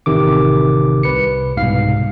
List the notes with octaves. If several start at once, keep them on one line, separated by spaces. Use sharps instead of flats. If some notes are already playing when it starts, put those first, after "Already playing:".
A1 C3 D#3 D6
C2 B4 C#7
C2 G#2 B2 F5 C7